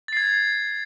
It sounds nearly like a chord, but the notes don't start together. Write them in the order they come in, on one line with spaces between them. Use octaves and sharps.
A6 C7 G#6